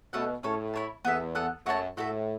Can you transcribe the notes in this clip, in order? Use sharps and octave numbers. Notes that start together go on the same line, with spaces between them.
B2 A3 C#4 A4 F#5
A2 C#4 A4 C#5
E4 C#5 A5
E2 B3 A4 E5
B3 A4 F#5
F#2 A3 F#4 C#5 A5
A2 A3 F#4 A4 E5